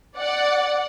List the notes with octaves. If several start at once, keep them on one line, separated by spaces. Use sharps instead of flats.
D5 F#5